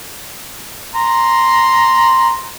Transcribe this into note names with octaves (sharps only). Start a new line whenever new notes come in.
A#5 C6